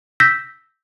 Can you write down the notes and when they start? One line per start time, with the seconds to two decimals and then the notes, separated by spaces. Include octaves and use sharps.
0.20 E6 G6 A#6 B6